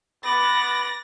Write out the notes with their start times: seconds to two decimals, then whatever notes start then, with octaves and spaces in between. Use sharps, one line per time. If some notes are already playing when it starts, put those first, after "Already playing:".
0.24 B3 B5 D6 A6 A#6